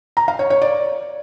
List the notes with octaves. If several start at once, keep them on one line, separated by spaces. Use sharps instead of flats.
A#5
F5
C#5
C#5
D5